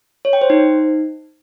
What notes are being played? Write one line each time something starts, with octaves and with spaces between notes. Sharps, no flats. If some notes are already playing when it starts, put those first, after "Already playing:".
C#5
G5
C5
D#4